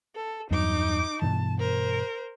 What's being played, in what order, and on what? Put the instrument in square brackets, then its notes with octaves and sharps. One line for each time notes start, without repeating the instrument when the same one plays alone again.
[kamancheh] A4
[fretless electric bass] E2 G2 F#3 [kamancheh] D#4 D6
[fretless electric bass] G2 B2 E3 [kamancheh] A5
[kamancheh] A#4 C5